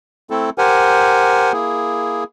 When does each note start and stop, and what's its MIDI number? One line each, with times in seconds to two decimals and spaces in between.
0.30 0.50 57
0.30 0.50 60
0.30 0.50 64
0.30 0.50 69
0.58 1.52 67
0.58 1.52 70
0.58 1.52 72
0.58 1.52 78
0.58 1.52 80
1.53 2.24 58
1.53 2.24 64
1.53 2.24 68